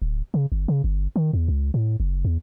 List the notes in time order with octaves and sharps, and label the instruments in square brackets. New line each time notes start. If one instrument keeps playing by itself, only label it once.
[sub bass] D1
C#3
G1
C#3
G1
D#3
E2
C#2
A2
F#1
E2